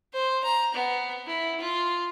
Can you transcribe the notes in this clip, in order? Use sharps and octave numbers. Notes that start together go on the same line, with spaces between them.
C5
A#5
B3
E4
F4